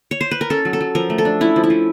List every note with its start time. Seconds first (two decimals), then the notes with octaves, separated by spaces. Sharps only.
0.11 C#5
0.21 C5
0.31 B4
0.41 A#4
0.50 C#4 A4
0.65 F#3
0.73 A4
0.81 F#3
0.95 F3 A#4
1.10 A3
1.18 A4
1.25 D4
1.41 C#4 E4
1.56 F3
1.64 E4
1.70 F3